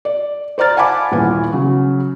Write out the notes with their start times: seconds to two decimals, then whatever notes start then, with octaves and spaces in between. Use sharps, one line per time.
0.05 D5
0.58 C5 D5 A#5 F6 A6
0.76 F5 F#5 G#5 A5 B5 D6
1.12 D#1 E3 B3 G#5
1.52 C#3 F#3